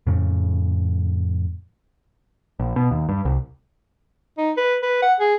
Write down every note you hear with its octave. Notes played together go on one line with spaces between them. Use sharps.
F2 A2 C#3
A#1
B2
D#2
G2
C2
D#4
B4
B4
F#5
G#4